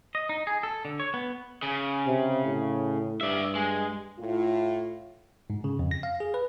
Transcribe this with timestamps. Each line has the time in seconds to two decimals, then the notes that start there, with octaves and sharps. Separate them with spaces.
0.15 D#5
0.29 D#4
0.47 G#4
0.63 A4
0.85 D3
1.00 C#5
1.14 B3
1.63 C#3
2.07 C3
2.45 A2
3.21 G2 D5 E5
3.55 G#3
4.19 A2 F4
5.50 G#2
5.64 C#3
5.79 F2
5.91 A#6
6.03 F5
6.20 G#4
6.34 B4